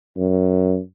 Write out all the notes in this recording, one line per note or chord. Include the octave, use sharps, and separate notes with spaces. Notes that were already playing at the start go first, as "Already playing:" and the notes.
F#2